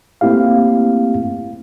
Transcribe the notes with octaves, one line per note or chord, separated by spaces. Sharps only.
A3 A#3 C4 E4 G4 F5